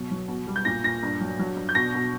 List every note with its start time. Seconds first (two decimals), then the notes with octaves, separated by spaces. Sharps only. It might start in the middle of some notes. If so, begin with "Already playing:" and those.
Already playing: B2 F#3
0.11 F#3
0.28 B2
0.47 G3
0.56 G6
0.65 A#2 A#6
0.84 A#2 A#6
1.03 G2
1.21 F#3
1.39 F#3
1.56 G2
1.69 G6
1.75 B2 A#6
1.94 B2